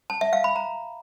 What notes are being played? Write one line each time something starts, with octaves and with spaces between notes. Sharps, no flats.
A5
E5
F5
B5
A#5